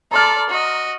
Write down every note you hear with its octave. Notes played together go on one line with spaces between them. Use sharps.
A4 D5 A#5 C6 F6
F#4 D#5